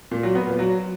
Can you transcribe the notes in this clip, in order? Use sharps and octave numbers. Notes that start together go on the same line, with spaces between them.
A#2
F#3
B3
A#2
F#3